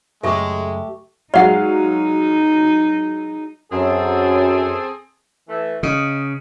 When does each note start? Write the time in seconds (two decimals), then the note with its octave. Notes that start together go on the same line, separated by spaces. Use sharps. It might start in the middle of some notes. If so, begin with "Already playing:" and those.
0.23 C#2 F#2 G#3 A3 G4 A4 E5 C#6
1.34 F#3 G#3 D#4 D5 F5 F#5
3.72 F#2 C4 G#4 A4
5.48 E3 A3
5.83 C#3 D#5